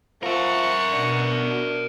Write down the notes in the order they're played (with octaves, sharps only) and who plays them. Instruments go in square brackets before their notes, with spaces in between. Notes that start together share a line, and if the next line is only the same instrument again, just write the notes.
[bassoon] F3 [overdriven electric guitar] A#4 E5 [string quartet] F#5 A#5 C#6
[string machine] B2 [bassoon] D4